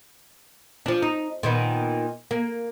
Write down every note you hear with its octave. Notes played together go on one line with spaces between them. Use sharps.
F3 D4
D#4
A#2 D#3 B3
A#3